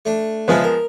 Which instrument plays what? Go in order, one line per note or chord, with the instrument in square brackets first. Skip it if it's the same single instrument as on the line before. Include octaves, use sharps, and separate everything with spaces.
[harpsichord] A3 D4
[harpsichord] C#3 C4 E4 [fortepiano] F3 G#3 B3
[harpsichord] A#4